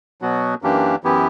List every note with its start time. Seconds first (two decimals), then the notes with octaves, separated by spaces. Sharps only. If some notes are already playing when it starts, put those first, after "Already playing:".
0.21 B2 F#3 B3 F#4
0.62 F#2 E3 A#3 D4 G4
1.04 F#2 E3 B3 E4 G4